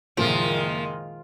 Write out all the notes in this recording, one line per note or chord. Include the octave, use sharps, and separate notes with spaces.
F#1 A#2 D#3 F3 G#3 D7